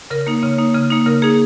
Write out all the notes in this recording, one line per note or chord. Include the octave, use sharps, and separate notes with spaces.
C#3 A#4
A#3 D#4
C#3 C#5
A#3 D#4
C#3
A#3 D#4
C#3 A#4
A#3 D#4 G#4